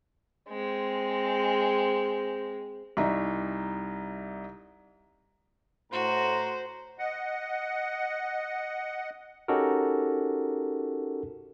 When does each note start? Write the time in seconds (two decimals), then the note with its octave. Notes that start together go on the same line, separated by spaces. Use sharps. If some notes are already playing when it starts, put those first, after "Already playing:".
0.49 G#3 C4
2.97 C2 D#4 E4 E5 A#5
5.92 A2 F#4 C5 A#5
6.99 D#5 F#5
9.48 C#4 D#4 F#4 G4 A4 A#4